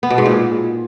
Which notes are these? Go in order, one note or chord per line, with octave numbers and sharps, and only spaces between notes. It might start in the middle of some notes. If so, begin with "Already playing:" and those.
B3
B2
G#2
A#2